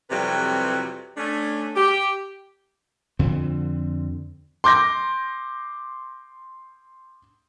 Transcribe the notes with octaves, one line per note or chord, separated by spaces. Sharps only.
F2 C3 E3 F#3 G3 B4
A3 C#4 D4
G4
F2 D3 C4
C6 D6 G6 A#6